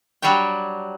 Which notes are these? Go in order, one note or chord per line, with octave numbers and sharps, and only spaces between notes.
F#3 G3 D4 C#5 G5